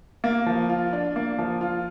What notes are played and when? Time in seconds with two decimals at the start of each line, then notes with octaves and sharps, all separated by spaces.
0.24 A#3
0.46 F3
0.69 F4
0.93 D4
1.16 A#3
1.38 F3
1.61 F4